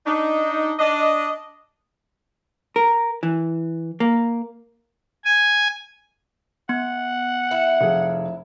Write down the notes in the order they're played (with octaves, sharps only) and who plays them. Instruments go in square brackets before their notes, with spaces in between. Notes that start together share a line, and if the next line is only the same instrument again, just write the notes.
[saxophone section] D4 D#4
D4 D#5
[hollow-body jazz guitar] A#4
E3
A#3
[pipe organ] G#5
[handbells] B3 [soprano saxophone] F#5
[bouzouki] E4
[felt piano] F1 G#4 F5